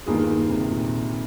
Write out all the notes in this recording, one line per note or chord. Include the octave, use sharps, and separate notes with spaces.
G2 D#3 A#3 F4 G#4
C3
A#2